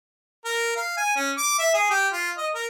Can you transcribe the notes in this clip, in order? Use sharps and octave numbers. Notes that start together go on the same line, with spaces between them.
A#4
F5
G#5
C#4
D6
E5
G#4
G4
F4
D#5
A#4